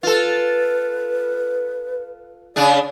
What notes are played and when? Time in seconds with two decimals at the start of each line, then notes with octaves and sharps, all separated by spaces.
0.03 F4 A4 B4
2.56 C#3 D4 G#4 D5